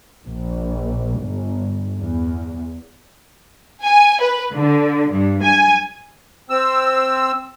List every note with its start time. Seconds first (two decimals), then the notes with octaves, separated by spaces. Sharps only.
0.25 A#1
1.20 G1
1.97 E2
3.83 G#5
4.20 B4
4.53 D3
5.10 G2
5.42 G#5
6.50 C4 E6